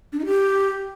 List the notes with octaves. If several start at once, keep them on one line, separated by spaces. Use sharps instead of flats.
D4
D#4
G4